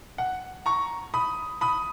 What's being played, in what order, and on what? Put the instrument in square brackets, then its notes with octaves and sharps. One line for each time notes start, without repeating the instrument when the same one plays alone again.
[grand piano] F#5
A#5 C#6
B5 D#6
B5 D#6